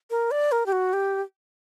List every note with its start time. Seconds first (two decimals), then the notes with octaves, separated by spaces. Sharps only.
0.10 A#4
0.31 D5
0.52 A#4
0.66 G4
0.72 F#4
0.93 G4